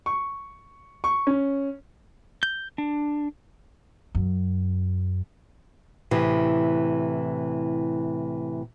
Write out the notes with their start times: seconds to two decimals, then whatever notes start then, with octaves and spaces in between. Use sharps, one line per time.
0.06 C#6
1.04 C#6
1.27 C#4
2.43 G6
2.78 D4
4.15 F#2
6.11 A2 C3 E3